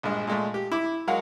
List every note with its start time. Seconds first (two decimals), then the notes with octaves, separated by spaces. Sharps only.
0.03 A#1 G2 G#3
0.27 A#2 G#3 A3
0.54 G4
0.72 E4 D6
1.07 F#3 G#3 A#4 C#5 F5 F#5